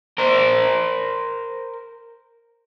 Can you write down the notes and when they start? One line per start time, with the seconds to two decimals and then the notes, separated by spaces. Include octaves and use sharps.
0.18 A#4 C5